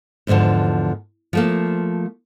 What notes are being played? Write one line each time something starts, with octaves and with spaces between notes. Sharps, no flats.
E2 G#2 B2 D3 F3
F3 A3 A#3